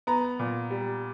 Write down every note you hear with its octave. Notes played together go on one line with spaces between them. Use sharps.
B3 A#5
A#2
G3